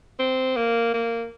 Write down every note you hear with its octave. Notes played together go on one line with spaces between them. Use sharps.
C4
A#3
A#3